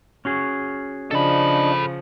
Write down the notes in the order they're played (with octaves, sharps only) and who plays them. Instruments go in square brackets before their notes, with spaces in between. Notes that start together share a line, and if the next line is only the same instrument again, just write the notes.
[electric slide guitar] C#4 F#4 G#4
[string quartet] C#3 F3 [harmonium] D4 D#5 [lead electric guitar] A4 B5